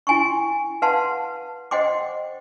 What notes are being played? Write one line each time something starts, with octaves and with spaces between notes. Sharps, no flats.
E4 G5 G#5 C6 C#6
B4 F5 F#5 A5 C6
C5 D#5 F#5 G5 C6 D6